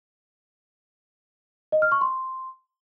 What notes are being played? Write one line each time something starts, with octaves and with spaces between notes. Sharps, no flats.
D#5
F6
C#6
C6